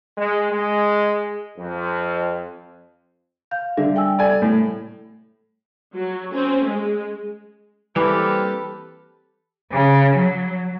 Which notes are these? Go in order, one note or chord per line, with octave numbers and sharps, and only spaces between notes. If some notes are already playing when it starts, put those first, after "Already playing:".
G#3
G#3
F2
F5 G6
D3 G3 E5
G5 G#5 E6
A4 D5 G#5
A2
F#3
C4 C#4
G#3
E3 G3 A#3 C4 G4 A4 B4
C#3
F#3